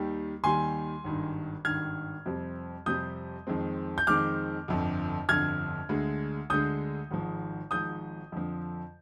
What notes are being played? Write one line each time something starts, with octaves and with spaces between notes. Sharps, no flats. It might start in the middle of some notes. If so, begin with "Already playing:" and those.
Already playing: D#2 D#3 G3
D#2 D#3 G3 G#5 C6
G#1 G2 D#3
G#1 G2 D#3 F6 G#6
F2 C3 G3 C4
F2 C3 G3 C4 D#6 G6
F2 D#3 G#3 C4
G6
F2 D#3 G#3 C4 D6 F6
G1 F2 D3
G1 F2 D3 F6 G#6
D2 D3 G#3
D2 D3 G#3 D#6 G6
G#1 G#2 F3
G#1 G#2 F3 D#6 G6
F2 D3 F3